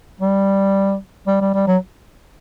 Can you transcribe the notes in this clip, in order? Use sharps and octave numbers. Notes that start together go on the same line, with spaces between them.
G3
G3
G3
G3
F#3